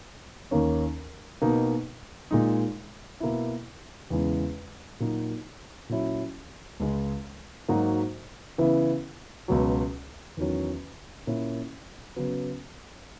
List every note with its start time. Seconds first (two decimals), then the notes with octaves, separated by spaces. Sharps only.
0.51 D#2 D#3 A#3 C#4
1.42 B2 A#3 D#4
2.31 A#2 G#3 D#4
3.20 B2 A#3 E4
4.10 E2 C#3 E3 G#3
5.00 A#2 F#3 A#3 D#4 F#4
5.89 A#2 F#3 C#4 E4
6.80 C#2 C#3 G#3
7.68 G#2 F#3 A#3 D#4 F#4
8.58 C#3 E3 B3 E4
9.48 C#2 B2 F#3
10.37 E2 D#3 F#3 C#4
11.27 A#2 A#3 C#4 E4
12.16 C#3 F#3 B3